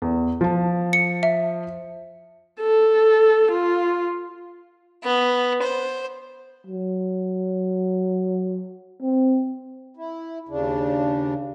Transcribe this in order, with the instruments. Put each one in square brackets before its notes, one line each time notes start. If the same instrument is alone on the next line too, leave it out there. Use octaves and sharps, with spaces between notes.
[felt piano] E2
F3 A5
[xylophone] C#7
E5
[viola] A4
F4
[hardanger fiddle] B3
C5
[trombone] F#3
C4
[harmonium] E4
D#2 C#3 D4